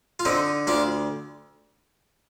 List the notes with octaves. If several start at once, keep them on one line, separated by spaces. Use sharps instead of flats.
F4
D3 C4 D#4
D2 D4 F4